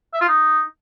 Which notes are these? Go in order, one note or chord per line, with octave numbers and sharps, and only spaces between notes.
E5
F4
D#4